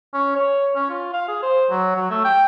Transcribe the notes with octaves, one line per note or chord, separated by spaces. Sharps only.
C#4
C#5
C#4
F4
F5
G#4
C5
F#3
F#3
A3
G5